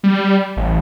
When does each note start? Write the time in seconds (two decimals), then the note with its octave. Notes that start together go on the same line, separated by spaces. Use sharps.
0.04 G3
0.57 A1